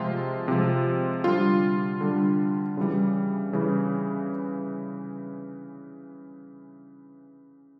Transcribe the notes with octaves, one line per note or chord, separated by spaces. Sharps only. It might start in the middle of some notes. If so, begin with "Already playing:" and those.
Already playing: C3 F3 G#3 F4
C3 F3 G#3
D3 G3 F4
D3 G3
C#3 E3 G3
C#3 E3 G3